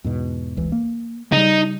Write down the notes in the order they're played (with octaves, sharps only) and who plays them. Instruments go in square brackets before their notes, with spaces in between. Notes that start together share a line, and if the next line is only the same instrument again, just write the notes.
[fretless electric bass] E2 G#2 B2
F1 C#2 E3
A#3
[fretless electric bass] C#3 G3 [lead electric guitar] D#4